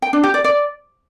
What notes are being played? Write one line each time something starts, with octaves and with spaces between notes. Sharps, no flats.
G5
D4
G4
D5
D5